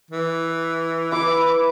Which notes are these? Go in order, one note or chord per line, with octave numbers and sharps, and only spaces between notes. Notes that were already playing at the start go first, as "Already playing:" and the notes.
E3
E4 B4 D6